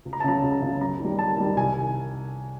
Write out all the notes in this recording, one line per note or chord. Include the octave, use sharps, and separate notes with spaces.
C#2
A#5
A5
C#3 F#3 A#5
C#2
C#3 F#3
F#2 A#5
D#3 G3
F#2 A5
D#3 G3
C2 G#5